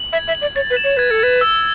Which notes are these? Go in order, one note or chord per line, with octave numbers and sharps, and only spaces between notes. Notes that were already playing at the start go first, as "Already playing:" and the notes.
Already playing: F#7
E5 G#6
E5
F#7
D5
C#5 A6
B4
E7
C#5
B4 G#6
A4
B4 G#6
E6